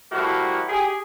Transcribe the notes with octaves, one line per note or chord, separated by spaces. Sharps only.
F3 G3 A3 A#3 E4 F#4
G4 G#4